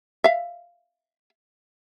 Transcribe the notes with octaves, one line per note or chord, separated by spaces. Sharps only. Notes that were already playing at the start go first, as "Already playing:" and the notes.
E5 F5